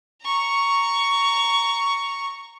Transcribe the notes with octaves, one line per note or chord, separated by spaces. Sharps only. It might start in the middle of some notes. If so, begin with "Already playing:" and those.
A#5 C#6